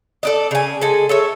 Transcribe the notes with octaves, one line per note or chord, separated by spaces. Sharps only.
A4 D5 D#5
C#3 G#5
G#3 G#4 A4 G#5
A4 C#5 E5